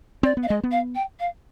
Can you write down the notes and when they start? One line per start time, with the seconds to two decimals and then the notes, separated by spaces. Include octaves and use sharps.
0.23 C4 D5
0.37 B3
0.43 F5
0.47 D#5
0.50 G#3
0.64 B3
0.71 F5
0.95 G5
1.19 F5